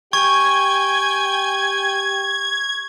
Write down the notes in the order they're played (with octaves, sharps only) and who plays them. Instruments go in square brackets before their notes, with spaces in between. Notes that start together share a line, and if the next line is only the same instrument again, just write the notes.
[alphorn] G4 [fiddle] G5 G#5 [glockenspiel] C#6 [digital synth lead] G#6